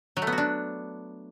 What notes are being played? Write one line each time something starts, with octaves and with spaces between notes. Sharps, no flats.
F#3
A3
B3
F#4
D4